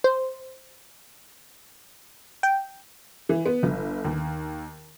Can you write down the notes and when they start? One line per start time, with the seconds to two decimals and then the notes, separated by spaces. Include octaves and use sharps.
0.04 C5
2.43 G5
3.29 E3
3.46 B3
3.63 G1
4.05 D#2